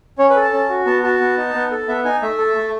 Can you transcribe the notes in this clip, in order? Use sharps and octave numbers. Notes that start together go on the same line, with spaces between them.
C#4 C#5
B4
A4
A5
C#4
F#4
B3 A5
F#4 A5
B3
D#4
B3
A4
B3 E5
D#4 G#5
A3 E5
A4
A3